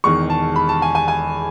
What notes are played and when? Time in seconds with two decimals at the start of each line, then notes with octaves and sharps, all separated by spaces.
0.04 E1 E2 D#3 C#6
0.30 A5
0.56 B5
0.69 A5
0.82 G#5
0.95 G#5
1.08 G#5